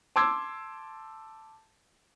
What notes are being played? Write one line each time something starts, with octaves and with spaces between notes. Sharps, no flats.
A5 C6 D6 E6 G#6